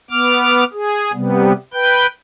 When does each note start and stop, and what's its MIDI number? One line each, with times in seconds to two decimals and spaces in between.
0.11 0.64 59
0.11 0.64 86
0.11 0.64 89
0.73 1.12 68
1.13 1.53 48
1.13 1.53 55
1.13 1.53 59
1.74 2.06 71
1.74 2.06 79
1.74 2.06 91